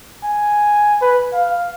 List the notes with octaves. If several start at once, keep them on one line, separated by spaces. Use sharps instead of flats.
G#5
B4
F5